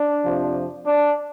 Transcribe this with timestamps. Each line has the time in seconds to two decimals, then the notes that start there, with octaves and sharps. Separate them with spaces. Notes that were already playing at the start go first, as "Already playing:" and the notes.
Already playing: D4
0.23 F2 C3 F3
0.85 D4